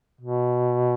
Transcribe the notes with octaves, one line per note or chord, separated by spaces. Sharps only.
B2